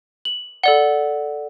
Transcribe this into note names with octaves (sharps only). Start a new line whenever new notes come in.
F#7
A4 D5 F#5 G7